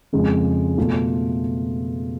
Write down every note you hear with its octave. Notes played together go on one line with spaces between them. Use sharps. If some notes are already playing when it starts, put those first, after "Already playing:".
F2 C#3 F3 G#3 C#4
B2 A3 F4 A4